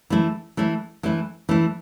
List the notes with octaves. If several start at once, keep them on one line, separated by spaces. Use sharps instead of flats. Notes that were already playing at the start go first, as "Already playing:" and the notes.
E3 A3 E4
E3 A3 E4
E3 A3 E4
E3 A3 E4